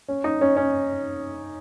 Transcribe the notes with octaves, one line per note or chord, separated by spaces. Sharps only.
C#4
D#4
C#4
C#4